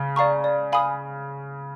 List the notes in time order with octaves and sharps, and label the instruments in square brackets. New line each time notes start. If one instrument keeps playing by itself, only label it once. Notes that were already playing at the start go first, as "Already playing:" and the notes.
Already playing: [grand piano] C#3
[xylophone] D5 F5 A#5 C#6
D5
F5 G#5 B5 D#6